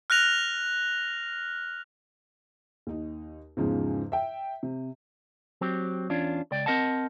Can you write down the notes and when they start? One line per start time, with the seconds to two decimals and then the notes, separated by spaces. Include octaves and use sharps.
0.10 F6 F#6 A#6 F7
2.87 D#2 D#4
3.57 E2 G#2 C#3 F3
4.12 E5 G5
4.63 C3
5.61 F#3 C4 G4
6.10 E2 C#4 D4 F4
6.52 C#2 D5 G5
6.66 C4 F4 A#4 D#5 F#5 A5